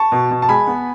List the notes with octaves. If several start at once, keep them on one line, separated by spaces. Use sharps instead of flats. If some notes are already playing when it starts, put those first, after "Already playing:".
Already playing: A5 C#6
B2
B2
A5
G#3 G#5 B5
B3